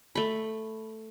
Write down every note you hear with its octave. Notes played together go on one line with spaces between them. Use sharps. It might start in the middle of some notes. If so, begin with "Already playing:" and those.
A3 B5